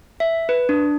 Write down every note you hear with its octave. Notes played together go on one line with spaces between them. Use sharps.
E5
B4
D4